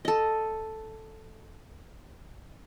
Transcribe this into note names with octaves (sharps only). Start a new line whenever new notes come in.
A4 D#5